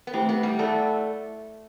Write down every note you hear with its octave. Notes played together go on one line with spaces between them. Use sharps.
B3
A3 C4 E4 G4
B3
G3
A3 E4 A4 D5 F#5 A5